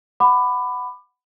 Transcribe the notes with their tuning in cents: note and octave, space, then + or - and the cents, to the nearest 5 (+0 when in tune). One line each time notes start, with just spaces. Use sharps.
F#5 +0 B5 +15 D6 +25